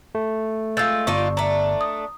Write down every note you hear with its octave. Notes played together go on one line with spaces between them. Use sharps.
A3
G#3 F4 E6 G6 A6
G1 D4 D#4 F4 C#6
A3 D4 A#5
D#6